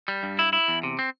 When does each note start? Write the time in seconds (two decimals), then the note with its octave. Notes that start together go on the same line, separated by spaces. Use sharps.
0.08 G3
0.23 G2
0.39 E4
0.53 E4
0.68 E2
0.83 C3
0.99 C4